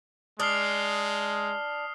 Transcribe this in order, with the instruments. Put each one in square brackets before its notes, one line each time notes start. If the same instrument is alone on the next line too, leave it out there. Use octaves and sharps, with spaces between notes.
[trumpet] G#3 [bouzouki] D4 [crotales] D#6 F6 C7